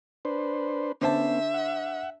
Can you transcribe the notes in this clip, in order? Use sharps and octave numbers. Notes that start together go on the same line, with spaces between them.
D4 B4 C5
D3 B3 C#4 C5 E5 A5
F#5